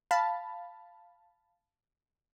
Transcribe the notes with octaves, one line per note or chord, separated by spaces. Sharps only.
F5 A5 B5